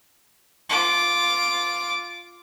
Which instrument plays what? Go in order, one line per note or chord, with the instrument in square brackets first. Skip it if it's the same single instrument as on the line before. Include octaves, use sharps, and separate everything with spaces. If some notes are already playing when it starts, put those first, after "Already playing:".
[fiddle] F4 D6